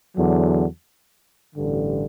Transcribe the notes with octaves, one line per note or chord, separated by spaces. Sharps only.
E2 D3 F#3
A1 G2 D3